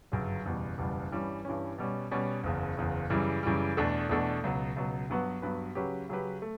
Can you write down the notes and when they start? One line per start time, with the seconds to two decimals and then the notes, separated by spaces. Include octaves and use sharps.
0.12 G1 F#2 C#3 F#3
0.46 F#1 E2 B2 G3
0.78 F#1 E2 B2 G3
1.11 G2 E3 G3 C#4
1.45 G2 E3 G3 C#4
1.78 B2 G3 C#4
2.11 B2 G3 C#4
2.44 F#1 E2 C#3
2.77 F#1 E2 C#3
3.10 F#2 C#3 E3 G3
3.43 F#2 C#3 E3 G3
3.77 E2 B2 A3 D4 A4
4.09 E2 B2 A3 D4 A4
4.43 C#2 B2 F#3
4.76 C#2 B2 F#3
5.10 G2 F#3 B3 F#4 B4
5.42 G2 F#3 B3 F#4 B4
5.75 C#3 F#3 C#4 G4 B4
6.09 C#3 F#3 C#4 G4 B4
6.42 A3